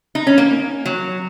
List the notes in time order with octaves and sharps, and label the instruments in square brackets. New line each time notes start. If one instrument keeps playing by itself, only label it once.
[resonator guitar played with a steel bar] D#4
C#4
A#3
F#3